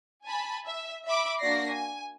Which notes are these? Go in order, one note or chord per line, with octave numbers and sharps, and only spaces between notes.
G#5 A5 B5
E5
E5 B5 D6
A#3 D4 F#4 D5 A#6 C7
G#5